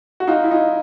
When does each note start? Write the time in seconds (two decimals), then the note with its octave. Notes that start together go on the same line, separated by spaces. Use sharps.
0.20 F#4
0.27 D#4 F4
0.44 E4
0.51 D#4 F4